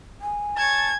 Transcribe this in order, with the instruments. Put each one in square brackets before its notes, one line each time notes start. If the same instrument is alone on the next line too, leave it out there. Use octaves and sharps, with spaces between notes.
[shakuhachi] G#5
[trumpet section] C#5 A5 [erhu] G#6